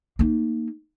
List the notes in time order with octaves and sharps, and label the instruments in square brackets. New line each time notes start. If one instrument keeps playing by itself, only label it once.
[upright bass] A#3 D#4